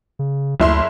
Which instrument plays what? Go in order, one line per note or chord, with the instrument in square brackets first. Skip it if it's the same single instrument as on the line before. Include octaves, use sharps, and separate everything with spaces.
[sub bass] C#3
[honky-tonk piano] F#1 E4 C6 [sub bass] D2